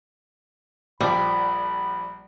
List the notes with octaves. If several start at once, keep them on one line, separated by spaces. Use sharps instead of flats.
A#1 F3 G3 D5 B5